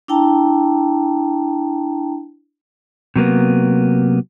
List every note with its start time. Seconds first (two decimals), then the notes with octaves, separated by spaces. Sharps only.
0.08 D4 E4 G5 A5 A#5
3.16 C3 F#3 A#3 B3